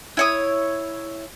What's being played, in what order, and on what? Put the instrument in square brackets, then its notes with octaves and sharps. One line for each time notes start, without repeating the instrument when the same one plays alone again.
[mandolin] E4 C#5 D#6